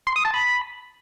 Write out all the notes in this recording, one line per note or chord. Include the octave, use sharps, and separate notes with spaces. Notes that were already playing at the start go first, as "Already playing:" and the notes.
C6
D#6
A5
B5